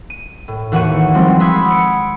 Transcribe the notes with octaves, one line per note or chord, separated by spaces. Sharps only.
D#7
A2
D#2 E3 F#4 F#5 C#6 D#7
F3 G3 G#3 C4
F#5 B5 C6 D#6 E6 G#6
C#7 D7